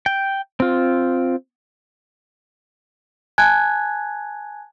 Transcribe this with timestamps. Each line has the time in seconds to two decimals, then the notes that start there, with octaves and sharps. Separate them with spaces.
0.06 G5
0.60 C4 F4
3.38 G#5 A5 F#6 G#6